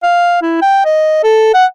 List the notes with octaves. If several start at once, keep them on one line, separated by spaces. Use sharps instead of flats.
F5
E4
G5
D#5
A4
F#5